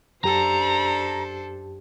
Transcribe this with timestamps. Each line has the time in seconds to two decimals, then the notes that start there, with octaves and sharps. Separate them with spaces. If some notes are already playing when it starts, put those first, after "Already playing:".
0.24 F#2 D4 G4 A4 C5 A#5